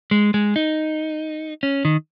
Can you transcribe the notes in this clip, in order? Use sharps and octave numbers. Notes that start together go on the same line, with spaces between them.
G#3
G#3
D#4
C#4
D#3